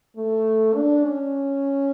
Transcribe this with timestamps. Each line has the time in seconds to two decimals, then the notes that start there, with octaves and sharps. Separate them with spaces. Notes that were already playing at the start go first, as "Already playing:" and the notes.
0.17 A3
0.75 D4
1.04 C#4